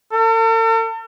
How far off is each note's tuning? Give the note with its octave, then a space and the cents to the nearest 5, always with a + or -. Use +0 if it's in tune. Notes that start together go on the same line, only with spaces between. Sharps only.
A4 +45